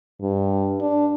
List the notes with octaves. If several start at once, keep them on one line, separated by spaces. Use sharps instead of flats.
G2
D4